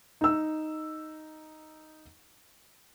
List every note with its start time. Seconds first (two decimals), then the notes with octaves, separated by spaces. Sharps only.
0.21 D#4 E6